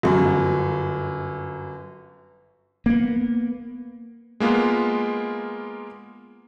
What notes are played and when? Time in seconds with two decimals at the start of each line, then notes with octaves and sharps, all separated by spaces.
0.03 G1 F#2
2.86 A#3 B3
4.40 G#3 A#3 B3 F4